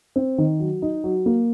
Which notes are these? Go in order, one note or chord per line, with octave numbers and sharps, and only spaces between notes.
C4
D#3
F#3
D#4
F#3
A#3